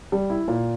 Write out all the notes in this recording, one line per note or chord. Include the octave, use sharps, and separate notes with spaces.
G3
E4
A#2